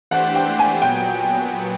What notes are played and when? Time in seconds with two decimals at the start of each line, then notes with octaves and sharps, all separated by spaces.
0.11 E3 A3 D4 G4 C5 F#5
0.35 G5
0.59 G#5
0.82 A#2 F#3 B3 G5